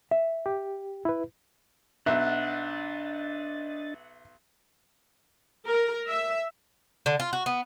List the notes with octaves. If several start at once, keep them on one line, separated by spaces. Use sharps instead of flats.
E5
G4
E4 B4
B1 D4 D#5 E5 F#5 A6
A#4
E5
D3
F4
F#4
B3